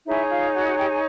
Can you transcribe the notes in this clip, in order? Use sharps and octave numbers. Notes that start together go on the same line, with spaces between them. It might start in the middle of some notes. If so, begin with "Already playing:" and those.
D#4 E4 G#4 C#5 E5
F4 F5
F#4 F#5
F#4 F#5
G4 G5
G#4 G#5